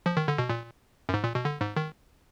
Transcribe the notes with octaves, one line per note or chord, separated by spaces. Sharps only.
F3
D#3
D3
B2
A#2
F#2
G#2
A#2
B2
D3
G#2
D#3